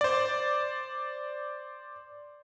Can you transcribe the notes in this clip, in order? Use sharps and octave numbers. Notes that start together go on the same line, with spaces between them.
C5 D5